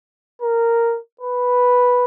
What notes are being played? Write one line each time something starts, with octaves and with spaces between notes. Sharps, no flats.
A#4
B4